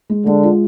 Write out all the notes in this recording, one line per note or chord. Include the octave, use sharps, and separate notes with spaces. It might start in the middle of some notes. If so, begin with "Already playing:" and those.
G#3
D3 G#3
F4